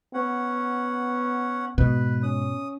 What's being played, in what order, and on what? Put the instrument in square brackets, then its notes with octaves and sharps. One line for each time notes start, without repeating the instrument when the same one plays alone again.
[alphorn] B3 [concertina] C#4 F#5
[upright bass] G#2 [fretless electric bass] B2 [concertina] B4
[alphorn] C#4 [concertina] D#6